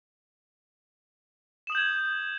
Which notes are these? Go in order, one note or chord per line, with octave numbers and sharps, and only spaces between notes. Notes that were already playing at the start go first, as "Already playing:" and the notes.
D#6 G6 G#6 E7 F#7